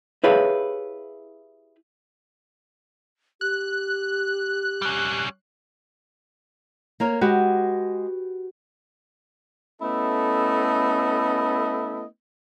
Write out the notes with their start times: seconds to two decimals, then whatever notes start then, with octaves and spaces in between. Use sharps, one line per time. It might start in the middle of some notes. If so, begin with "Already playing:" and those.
0.24 E4 G4 G#4 B4 C#5 F5
3.41 G4 F#6
4.82 G3 C#4
7.00 A#3 A#4 C#5
7.21 G#3 F#4 G4 B4
9.82 A3 B3 C#4 E4 A4 D#5